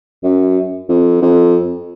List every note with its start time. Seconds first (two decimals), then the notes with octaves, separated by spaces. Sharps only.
0.23 F#2
0.89 F2
1.22 F2